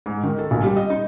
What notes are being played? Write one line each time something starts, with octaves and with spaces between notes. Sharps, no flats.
G#2
D#3
A4
A#1
G3
D#5
D#4